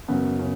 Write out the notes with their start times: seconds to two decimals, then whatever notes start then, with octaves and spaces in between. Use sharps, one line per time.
0.08 F#2 C#3 B3
0.39 C#3